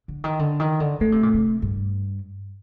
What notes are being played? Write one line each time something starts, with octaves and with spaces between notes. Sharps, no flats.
D3
D#3
D3
D#3
D3
D3 A3
C3
A#2
C3
G2